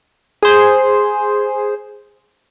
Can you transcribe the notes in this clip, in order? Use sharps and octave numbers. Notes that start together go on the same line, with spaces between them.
G#4 C5